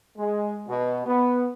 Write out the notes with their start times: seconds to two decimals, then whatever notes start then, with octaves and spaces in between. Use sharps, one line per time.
0.17 G#3
0.68 B2
1.06 B3